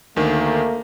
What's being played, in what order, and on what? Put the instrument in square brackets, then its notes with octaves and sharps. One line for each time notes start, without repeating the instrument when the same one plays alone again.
[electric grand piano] D2 D#3 [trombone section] A3 A#3